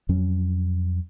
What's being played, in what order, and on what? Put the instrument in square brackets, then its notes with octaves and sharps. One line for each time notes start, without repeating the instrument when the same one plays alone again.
[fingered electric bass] F2 F#3 C#4